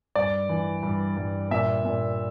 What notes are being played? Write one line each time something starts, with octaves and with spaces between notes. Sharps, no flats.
G2 D5
E3
G2
G2
A#2 E5
A#2